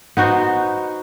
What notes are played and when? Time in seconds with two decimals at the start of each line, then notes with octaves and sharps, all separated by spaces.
0.17 B3 D#4 F#4 C5